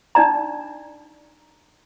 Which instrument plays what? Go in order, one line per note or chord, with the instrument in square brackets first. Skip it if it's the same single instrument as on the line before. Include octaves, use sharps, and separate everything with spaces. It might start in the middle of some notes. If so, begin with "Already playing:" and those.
[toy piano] D4 D#4 D5 A#5